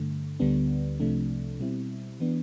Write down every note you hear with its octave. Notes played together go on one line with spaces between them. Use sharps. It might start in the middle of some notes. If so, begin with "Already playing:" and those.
Already playing: G2 D3 A3
D2 D3 G3 B3 D4
C2 C3 F3 A3 D4
B2 G3 C4 E4
E3 B3 D4